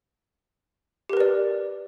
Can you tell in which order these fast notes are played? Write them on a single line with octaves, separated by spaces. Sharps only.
G4 A#4 B4 D5